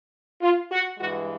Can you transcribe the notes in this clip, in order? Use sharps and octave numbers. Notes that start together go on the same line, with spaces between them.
F4
F#4
G2 E3 G#3 F#4